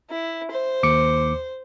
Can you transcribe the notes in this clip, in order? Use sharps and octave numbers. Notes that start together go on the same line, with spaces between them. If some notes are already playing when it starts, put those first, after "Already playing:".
E4
C5
D#2 D6 C#7